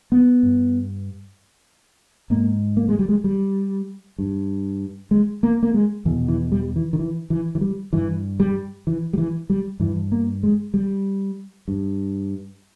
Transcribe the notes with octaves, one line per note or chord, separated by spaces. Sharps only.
B3
G2
G#2 A#3
A#3
G#3
G3
G#3
G3
G2
G#3
A#3
A#3
G#3
E2 B2 E3
E3
G3
E3
D#3
E3
E3
E3
G3
G2 E3
G3
E3
G3
E3
G3
G2 E3
A#3
G#3
G3
G2